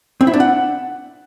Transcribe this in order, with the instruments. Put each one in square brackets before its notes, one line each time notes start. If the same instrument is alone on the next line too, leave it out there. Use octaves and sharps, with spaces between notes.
[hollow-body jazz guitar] C4
E4
D4
F#5